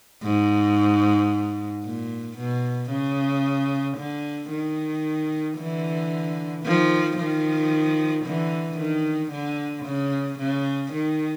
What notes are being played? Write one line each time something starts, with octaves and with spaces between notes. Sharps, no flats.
G#2
A#2
B2
C#3
D3
D#3
D3 E3
D#3 F3
D#3 F3
D3 E3
D#3
D3
C#3
C#3
D#3